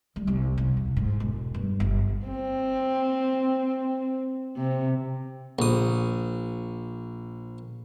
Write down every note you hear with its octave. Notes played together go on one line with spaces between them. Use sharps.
G3
C2
C3
E2
G#2
E1
G2
G1
C4
C3
A#1 D#6